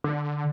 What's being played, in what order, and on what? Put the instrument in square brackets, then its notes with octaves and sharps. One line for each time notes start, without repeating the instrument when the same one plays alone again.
[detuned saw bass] D3